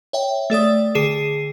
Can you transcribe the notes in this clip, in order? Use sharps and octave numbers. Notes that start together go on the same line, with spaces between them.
C#5 E5 G5
A3 A4 D5 D#6
D3 G#4 C7 E7